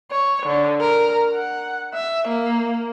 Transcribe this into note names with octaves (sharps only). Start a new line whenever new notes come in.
C#5
D3
A#4
F#5
E5
A#3